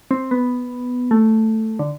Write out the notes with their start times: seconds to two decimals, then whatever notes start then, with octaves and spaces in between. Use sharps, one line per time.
0.11 C4
0.31 B3
1.11 A3
1.79 D3